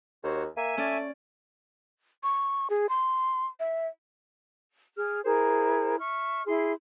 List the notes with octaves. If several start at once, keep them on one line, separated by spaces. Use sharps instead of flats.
D#2 F#4 C5 C#5
A#3 E5 G#5
A3 C#4 D5
C#6
G#4
C6
E5
G#4 F6
E4 G#4 A#4 C5
E5 C#6 F6
E4 G#4 C6